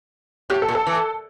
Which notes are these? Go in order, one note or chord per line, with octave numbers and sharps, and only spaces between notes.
A2 G4
A4
A#2
A4
E3